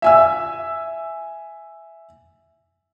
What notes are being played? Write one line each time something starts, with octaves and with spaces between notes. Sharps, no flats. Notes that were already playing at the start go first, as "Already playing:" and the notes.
E5 G#5 E6